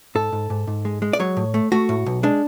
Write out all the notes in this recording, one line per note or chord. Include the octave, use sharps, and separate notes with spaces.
G#2 A4
G#2
G#2
G#2
G#3
G#3
D5
F#3 C#5
A2
A3
A3 F#4
A2
B1
G#3 D4